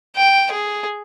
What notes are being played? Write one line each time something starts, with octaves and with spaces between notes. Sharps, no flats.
G5
G#4